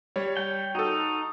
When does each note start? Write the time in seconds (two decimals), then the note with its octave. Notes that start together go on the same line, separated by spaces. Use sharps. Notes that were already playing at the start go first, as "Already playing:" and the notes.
0.16 G3 C#5
0.37 G5
0.75 D#4 F#4 A4